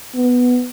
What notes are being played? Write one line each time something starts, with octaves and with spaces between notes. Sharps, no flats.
B3